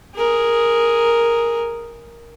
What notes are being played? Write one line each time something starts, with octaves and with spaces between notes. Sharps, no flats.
G#4 A#4